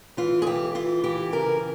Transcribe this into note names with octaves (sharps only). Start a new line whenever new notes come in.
E3 F4
G#4
E3 G4
E3 F4
E3 G4
C#3 A#4